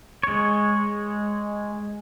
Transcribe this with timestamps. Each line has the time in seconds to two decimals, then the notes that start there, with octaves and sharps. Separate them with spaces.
0.23 G#3 C#5